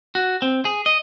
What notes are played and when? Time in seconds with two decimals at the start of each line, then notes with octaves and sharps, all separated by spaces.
0.15 F#4
0.42 C4
0.65 G#4
0.86 D#5